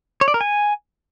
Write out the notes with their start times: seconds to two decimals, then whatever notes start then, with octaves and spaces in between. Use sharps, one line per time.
0.21 C#5
0.28 D5
0.34 A#4
0.41 G#5